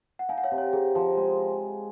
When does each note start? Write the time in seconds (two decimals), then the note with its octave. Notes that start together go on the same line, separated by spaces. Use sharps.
0.19 F#5
0.29 D#4 F5 G#5
0.38 F#5
0.43 C#5 F5
0.51 C3
0.58 C#5
0.73 D#4 G#4
0.95 F3
1.17 G#3